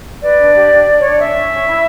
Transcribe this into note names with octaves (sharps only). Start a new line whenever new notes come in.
B4 D5
D4
G4
D4
D4
D4 C#5
D5
C#4 E5
C#4
C#4
E4